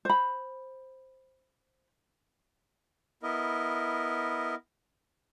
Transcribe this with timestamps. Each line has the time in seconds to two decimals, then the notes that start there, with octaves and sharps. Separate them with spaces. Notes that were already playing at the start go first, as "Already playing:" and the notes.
0.05 C5 B5
3.23 B3 E4 A#4 D#5